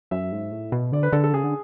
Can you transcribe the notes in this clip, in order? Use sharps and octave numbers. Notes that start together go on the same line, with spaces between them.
F#2 E5
G#2
A2
B2
D3 D5
B4
D3 A4
A4
C#3 G#4
D3